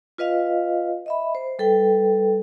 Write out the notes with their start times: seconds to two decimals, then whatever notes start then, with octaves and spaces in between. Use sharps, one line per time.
0.18 F4 B4 D#5 F5
1.06 D#5 E5 B5
1.35 C5
1.59 G3 A4 B4 G5